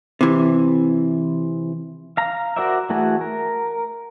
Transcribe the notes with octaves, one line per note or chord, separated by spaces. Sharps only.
C3 E3
F5 A#5
F#4 A#4 C5 D5 E5
E3 A3 F#4 G#4
A#4